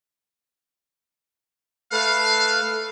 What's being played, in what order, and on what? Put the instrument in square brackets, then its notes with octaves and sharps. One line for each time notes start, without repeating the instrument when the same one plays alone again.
[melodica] A3 A4 B4 [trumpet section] F5